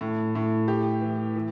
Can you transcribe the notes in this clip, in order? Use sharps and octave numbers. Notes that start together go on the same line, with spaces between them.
A2
A2
G4
E3
E3